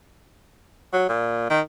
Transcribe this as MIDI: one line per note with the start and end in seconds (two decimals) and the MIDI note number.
0.93 1.09 54
1.09 1.45 46
1.50 1.61 51